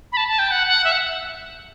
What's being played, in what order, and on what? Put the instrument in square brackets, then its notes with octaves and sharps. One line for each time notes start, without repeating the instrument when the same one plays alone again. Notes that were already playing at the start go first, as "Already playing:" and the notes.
[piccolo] B5
A5
A5
G5
F#5
F#5
E5
F#5